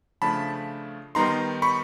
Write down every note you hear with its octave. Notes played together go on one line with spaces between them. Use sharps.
C#3 F3 A3 D4 A5 B5
D#3 G3 B3 D#4 A#5 C6
B5 C#6